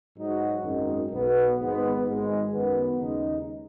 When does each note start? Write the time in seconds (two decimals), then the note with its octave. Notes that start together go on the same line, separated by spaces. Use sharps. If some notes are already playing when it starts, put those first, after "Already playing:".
0.17 G#2 F#3 D#4 F#4
0.64 G#1 F#2 D#3 G#3 D#4
1.10 B1 B2 B3
1.58 G#1 G#2 G#3 B3
2.05 G#1 G#2 G#3
2.51 F#2 D#3 B3
2.98 D#2 C#3 G#3 D#4